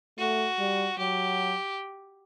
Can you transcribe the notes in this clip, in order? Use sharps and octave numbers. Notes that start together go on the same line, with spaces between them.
A3 F#4
G3
F#3 G4